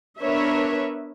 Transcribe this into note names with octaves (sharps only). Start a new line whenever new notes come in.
B3 D4 A#4 B4 C#5 E5